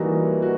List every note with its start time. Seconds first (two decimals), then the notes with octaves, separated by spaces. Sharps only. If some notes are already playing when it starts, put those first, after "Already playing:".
Already playing: E3 G3 A#3 D#4 F#4
0.42 F#4